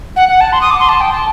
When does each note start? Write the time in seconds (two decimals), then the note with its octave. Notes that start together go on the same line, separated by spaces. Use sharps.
0.16 F#5
0.28 F#5
0.40 A5
0.52 C6
0.61 D#6
0.70 D6
0.79 C6
0.89 A5
1.01 G5
1.12 A5